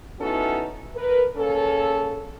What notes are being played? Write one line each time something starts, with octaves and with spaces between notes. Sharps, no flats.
B3 C#4 D#4 E4 F#4 A4
A#4 B4
C#3 A#3 C#4 A4